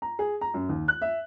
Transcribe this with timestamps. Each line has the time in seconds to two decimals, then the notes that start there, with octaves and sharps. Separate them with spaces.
0.02 A#5
0.19 G#4
0.41 A#5
0.54 F#2
0.69 D#2
0.88 F#6
1.02 E5